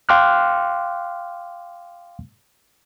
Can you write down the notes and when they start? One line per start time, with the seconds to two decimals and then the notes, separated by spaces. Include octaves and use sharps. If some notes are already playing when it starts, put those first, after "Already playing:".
0.09 F5 G5 C6 D6 F6 F#6